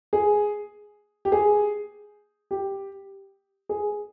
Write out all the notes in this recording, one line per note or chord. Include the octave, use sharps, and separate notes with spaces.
G#4
G4
G#4
G4
G#4